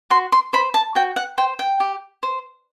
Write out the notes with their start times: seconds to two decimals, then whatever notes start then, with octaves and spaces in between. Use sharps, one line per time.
0.10 F#4 C6
0.32 C6
0.53 C5 B5
0.74 A5
0.95 F#4 G5
1.16 F#5
1.38 C5 G5
1.59 G5
1.80 G4
2.23 C5